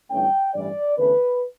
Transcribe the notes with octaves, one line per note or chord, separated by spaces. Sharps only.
G1 G2 E3 A3 C#4 G5
A1 G2 E3 G3 D5
E2 D3 A3 C#4 B4